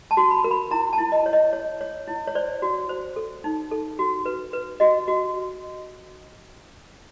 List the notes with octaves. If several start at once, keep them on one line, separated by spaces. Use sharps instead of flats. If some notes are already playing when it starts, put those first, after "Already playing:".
A5
F#4
B5
A#4
B5
E4 A#5
A5
E4
D#5
C#5
D#5
C#5
C#5
E4
C#5
C5 D5
F#4
C5
A4
D#4
A4
F#4
B4
B4
F#4 D#5
F#4